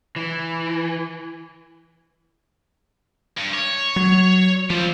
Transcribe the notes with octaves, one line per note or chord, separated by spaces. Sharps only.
E3
G2
C#5
F#3
F3 G3 C4